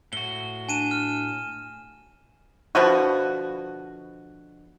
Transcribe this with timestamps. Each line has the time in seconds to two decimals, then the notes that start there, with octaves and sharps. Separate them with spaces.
0.13 A2 F#4 G7
0.69 D4 G#5 D#7 E7
0.91 F6
2.75 B2 D3 F3 F#4